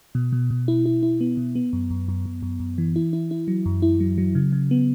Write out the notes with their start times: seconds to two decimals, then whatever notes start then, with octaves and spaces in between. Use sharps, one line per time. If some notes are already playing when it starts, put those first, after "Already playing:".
0.15 B2
0.33 B2
0.50 B2
0.68 E4
0.86 E4
1.03 E4
1.21 B3
1.37 B2
1.55 B3
1.73 F#2
1.91 F#2
2.08 F#2
2.25 F#2
2.42 F#2
2.60 F#2
2.78 E3
2.96 E4
3.13 E4
3.31 E4
3.48 F#3
3.66 F#2
3.82 E4
4.00 F#3
4.18 F#3
4.35 C#3
4.52 C#3
4.71 B3